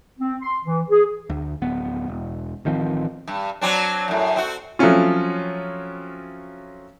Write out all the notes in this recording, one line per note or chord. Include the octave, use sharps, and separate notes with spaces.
C4
C6
E3
G#4
D2
D1 B3
E1
A1 D#3 F3 C4
G2
F#3 C4 D4
F#2 A2
C4 F#4
F3 F#3 A3 C4 C#4 F4